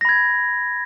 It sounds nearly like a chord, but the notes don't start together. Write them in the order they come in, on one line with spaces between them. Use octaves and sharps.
A#6 B5 G#6